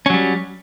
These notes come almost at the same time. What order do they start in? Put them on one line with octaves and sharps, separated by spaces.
C#4 F#3 G3